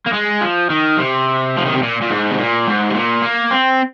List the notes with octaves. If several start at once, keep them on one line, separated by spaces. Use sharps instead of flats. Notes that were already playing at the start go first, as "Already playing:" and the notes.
A#3
G#3
F3
D#3
C3
F3
D#3
C3
A#2
A#2
G#2
C3
A#2
G#2
C3
A#2
A#3
C4